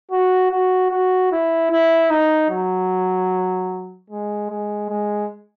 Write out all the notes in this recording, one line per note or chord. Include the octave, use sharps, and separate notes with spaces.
F#4
F#4
F#4
E4
E4
D#4
F#3
G#3
G#3
G#3